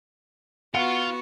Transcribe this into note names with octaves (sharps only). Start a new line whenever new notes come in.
B3 F4 F#4 F#5 C#7